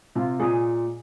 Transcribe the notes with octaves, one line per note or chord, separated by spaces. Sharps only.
C3 F4
A#2 G#4